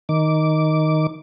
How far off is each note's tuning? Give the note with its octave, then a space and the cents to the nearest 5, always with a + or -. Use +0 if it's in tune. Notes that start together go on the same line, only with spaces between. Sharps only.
D#3 +5 D6 -15